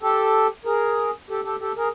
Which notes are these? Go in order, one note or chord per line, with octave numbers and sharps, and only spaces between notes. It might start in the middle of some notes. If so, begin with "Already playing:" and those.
G4 A4
G#4 A#4
G4 A4
G4 A4
G4 A4
G#4 A#4